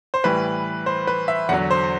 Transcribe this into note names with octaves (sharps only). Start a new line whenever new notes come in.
C5
A2 E3 G3 B4
C5
B4
E5
E2 D3 F#3 F#5
C5